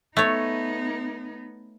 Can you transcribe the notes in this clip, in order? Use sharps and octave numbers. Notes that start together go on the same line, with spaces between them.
A3 B3 D#4 C#5